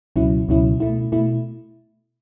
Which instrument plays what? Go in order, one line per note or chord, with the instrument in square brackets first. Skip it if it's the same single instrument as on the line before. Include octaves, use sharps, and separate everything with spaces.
[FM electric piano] C#2 B2 F#3 C#4 E4
C#2 B2 F#3 C#4 E4
B2 A3 E4
B2 A3 E4